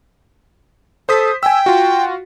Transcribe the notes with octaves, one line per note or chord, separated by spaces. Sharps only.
A4 C5 D#6 B6
G5 G#5 E6
F4 F#4